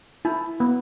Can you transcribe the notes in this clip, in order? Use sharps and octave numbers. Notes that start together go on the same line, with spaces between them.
E4
B3